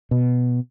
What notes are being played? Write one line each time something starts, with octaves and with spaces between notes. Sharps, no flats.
B2